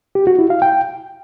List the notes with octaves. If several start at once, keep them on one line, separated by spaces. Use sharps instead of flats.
G4
F#4
E4
F5
G5